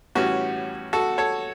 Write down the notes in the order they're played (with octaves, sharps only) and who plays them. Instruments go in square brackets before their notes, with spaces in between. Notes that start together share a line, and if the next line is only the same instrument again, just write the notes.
[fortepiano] A2 E3 G3 C#4 F#4
F#4 A4
A4 C#5